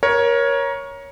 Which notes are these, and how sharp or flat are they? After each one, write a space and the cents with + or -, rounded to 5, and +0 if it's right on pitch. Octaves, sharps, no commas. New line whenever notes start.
A#4 +25 C#5 +0